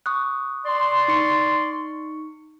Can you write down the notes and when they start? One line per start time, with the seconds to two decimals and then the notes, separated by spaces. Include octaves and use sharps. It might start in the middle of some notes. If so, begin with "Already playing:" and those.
0.06 C#6 D#6 F#6
0.65 D5 C6
1.08 D#4 C#6 C#7